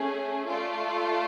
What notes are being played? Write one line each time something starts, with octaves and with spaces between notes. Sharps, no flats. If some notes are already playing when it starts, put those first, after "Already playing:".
Already playing: A3 C#4 G#4
A3 F4 A4 D5